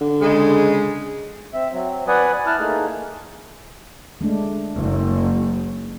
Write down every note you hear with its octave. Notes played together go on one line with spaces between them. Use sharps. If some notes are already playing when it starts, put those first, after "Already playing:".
D3
C#3 G#3
C4 E5
F#3 C4
B4 D5 F#5 G#5 D#6
E4 A5 F6 F#6
A3 A#3 D#4 G#4
G#3 A3 D4
F#1